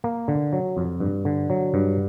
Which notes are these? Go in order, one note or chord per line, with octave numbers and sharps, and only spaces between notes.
A#3
D3
F#3
F2
G2
D3
F#3
G2